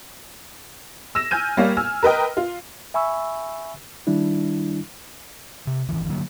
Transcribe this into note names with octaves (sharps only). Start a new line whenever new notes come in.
E6 A#6 E7
G#5 F6 G6 D#7
G3 A#3 C#5 F5
G#5 E6 F6
A#4 B4 D#5 G5
F4
E5 G#5 B5 C#6 E6
D#3 G3 D4 E4
C3
D1 G1 D#3 E3
D3 F#3 A#3